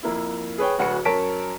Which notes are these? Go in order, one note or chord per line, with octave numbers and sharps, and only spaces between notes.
F2 A#3 E4
G#4 B4 C#5 G5
D1 D2 F#4 B4 C#7
F#2 A#4 C#5 A5 B6 D7